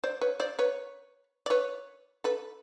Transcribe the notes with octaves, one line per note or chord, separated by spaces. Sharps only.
C5 D5
B4 C#5
C5 D5
B4 C#5
D5
B4 C#5
A4 B4